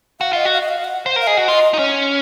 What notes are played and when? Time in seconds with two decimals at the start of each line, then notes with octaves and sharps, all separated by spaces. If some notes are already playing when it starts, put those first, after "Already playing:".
0.20 F#4 F5
0.33 F4 D#5
0.45 F#4
0.53 F5
0.61 D#5
0.69 F5
0.85 F#5
1.06 C5
1.16 A#4
1.21 F5
1.27 G#4 D#5
1.37 F#4
1.48 F4 D#5
1.74 D#4
1.79 C#4